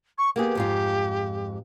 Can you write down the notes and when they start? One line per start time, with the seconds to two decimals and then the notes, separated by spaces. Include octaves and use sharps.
0.18 C#6
0.36 A#3 B3 G4 G#4
0.55 F2 G#2 F4